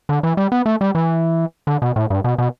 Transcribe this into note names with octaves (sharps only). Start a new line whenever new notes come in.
D3
E3
G3
B3
A3
G3
E3
D3
B2
A2
G2
B2
B2